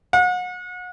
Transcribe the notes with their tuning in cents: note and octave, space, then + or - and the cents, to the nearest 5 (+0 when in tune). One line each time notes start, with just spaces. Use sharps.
F#5 -35